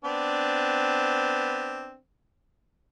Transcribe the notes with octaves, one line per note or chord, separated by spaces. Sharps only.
B3 C4 D4